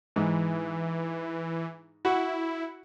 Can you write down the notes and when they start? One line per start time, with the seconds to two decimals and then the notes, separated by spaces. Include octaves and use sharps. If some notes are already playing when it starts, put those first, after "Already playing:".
0.16 G#2 E3
2.05 E4 F#4